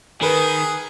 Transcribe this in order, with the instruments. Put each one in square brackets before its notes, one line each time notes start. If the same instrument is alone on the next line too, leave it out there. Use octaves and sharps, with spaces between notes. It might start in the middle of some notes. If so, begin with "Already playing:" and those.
[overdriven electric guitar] D#3 [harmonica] G#4 [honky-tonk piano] A#4 B4